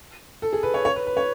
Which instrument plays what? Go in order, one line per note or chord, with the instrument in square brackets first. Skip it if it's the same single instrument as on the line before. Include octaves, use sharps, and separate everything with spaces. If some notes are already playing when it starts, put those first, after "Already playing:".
[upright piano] A4
G#4
B4
C#5
C#5
B4
B4
C#5